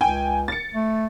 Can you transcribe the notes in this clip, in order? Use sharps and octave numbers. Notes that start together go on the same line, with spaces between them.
C#2 G5 G#5
A6 C#7
A3